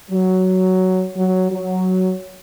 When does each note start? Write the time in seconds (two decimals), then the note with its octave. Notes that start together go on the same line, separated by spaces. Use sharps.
0.11 F#3
1.16 F#3
1.51 F#3